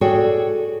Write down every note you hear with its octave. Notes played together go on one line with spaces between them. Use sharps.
F#4 G#4 A4 C#5 D5 G5